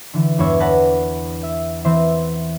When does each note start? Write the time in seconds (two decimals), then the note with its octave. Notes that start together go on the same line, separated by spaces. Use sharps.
0.13 D3 E3
0.38 E2 G2 B3 D4 C#5 E5
0.60 B4 D5 F#5 A5 A#6
1.43 E5
1.85 E3 C4 C5 E5